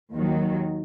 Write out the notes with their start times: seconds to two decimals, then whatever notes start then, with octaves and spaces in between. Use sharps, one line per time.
0.13 D#2 D#3 F#3